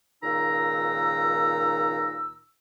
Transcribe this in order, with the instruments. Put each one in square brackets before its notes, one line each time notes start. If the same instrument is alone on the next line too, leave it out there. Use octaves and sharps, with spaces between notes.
[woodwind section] C#2 A#2 D#3 D#4 A#5 E6